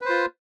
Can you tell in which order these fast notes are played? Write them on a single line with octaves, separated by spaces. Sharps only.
B4 C5 F4